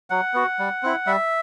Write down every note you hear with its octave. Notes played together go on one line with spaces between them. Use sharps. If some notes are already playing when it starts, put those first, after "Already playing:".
F#3 F#5
B3 F#4
G3
C4 E4
G3 E5